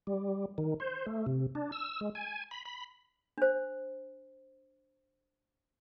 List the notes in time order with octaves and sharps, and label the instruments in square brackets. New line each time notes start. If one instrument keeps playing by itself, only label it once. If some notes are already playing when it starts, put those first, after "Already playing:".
[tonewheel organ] G3
D#3
C5
A3
C3
D4
E6
G#3
G#5
B5
B5
[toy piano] D4 C5